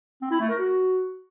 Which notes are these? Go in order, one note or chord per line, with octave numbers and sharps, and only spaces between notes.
C4
E4
A3
A#4
F#4